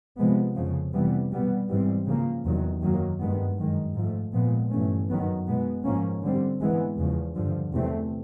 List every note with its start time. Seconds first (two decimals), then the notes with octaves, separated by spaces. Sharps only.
0.18 C3 F3 G#3 B3
0.55 F2 C#3 F3
0.94 C3 E3 G3 B3
1.31 B2 G3 B3
1.69 G#2 E3 G3 C4
2.06 C#3 F3 A#3
2.45 E2 C3 D#3 F#3
2.83 F#2 D#3 F#3 A#3
3.20 G2 D#3 G#3 B3
3.58 F#2 D#3 G#3
3.95 G#2 F3 A3
4.33 A#2 F3 G#3 B3
4.71 G2 E3 A3 C#4
5.09 F#2 D#3 F#3 B3
5.47 B2 G#3 B3
5.84 G#2 F3 A#3 C#4
6.23 D3 G3 C4
6.60 G#2 E3 G#3 B3
6.98 E2 C#3 F3
7.35 G2 D3 F3
7.73 E2 C3 E3 A3 C4